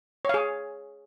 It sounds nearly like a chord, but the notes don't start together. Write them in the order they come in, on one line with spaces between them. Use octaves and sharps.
C#5 F5 G#4